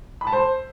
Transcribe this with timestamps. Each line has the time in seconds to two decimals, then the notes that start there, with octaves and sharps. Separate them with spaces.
0.21 B5
0.27 A5
0.33 C5